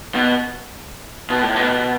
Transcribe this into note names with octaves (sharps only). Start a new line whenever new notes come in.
B2
B2
A2
B2